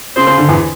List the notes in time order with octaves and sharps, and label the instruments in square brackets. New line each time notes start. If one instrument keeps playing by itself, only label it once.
[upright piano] C#3 [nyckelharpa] C5
[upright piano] C#3
D3
E2 E3